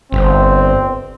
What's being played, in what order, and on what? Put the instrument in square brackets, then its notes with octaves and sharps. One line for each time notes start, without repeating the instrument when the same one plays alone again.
[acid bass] G1 [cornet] C4